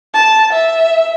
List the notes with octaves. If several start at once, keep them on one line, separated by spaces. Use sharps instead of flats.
A5
E5